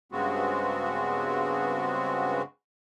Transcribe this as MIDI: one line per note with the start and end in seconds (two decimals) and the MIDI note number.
0.12 2.42 43
0.12 2.42 49
0.12 2.42 56
0.12 2.42 59
0.12 2.42 60
0.12 2.42 66